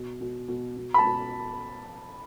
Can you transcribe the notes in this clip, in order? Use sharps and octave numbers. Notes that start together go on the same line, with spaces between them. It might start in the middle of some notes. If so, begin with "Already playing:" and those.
Already playing: B2
B2
B2
B2
B5
A5
B2